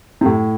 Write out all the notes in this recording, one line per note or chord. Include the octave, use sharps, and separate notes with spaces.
C3
A2